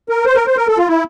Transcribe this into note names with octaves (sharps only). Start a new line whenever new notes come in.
A#4
C5
A#4
C5
A#4
A4
F4
E4